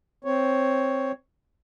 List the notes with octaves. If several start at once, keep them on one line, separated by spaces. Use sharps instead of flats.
C4 C#5